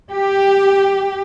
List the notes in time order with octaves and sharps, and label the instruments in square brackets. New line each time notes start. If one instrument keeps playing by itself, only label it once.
[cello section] G4